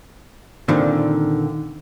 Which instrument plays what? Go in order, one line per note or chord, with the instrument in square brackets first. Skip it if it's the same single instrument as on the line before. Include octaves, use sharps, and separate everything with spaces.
[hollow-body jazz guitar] A#2 D3 D#3 C4